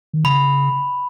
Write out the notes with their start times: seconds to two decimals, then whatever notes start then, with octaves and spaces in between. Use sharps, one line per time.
0.13 D#3
0.24 C#3 B5